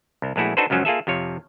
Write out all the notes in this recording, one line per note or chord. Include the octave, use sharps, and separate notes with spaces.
C2
A#1 G#3 A3 E4 F#4
D4 D#4 F#4 A4 B4 C5
C#2 F#2 F3 F#3 C#4
A#3 F4 G#4 A4 E5
F2 C3 F3 C#5